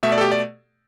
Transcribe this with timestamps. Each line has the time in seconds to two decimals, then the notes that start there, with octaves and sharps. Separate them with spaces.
0.03 B2 A3 E5
0.12 D5
0.18 A4
0.21 G4
0.32 D5